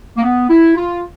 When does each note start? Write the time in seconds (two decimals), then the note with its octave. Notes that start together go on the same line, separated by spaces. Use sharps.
0.17 A#3
0.23 B3
0.49 E4
0.76 F4